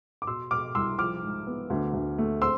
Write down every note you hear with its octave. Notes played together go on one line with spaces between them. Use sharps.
D6
B2 C6 E6
B2 D6 F6
C2 C6 E6
F3 D6 F6
G#2
B3
D2
D2
A3
C4 C6 E6